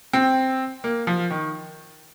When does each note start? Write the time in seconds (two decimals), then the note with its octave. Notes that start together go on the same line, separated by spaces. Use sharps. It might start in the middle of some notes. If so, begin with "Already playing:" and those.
0.13 C4
0.84 A#3
1.07 F3
1.31 D#3